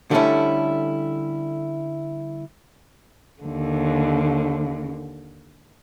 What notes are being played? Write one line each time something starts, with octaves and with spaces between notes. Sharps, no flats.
D3 G3 A3 C4 C#4 E4
D#2 D3